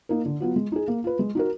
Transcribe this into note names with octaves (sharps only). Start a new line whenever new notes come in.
A#3 D#4 A#4
D3
F#3 B3 F4
G#3
D#4 G#4
A#3
F4 B4
G#3
D#4 F#4 A#4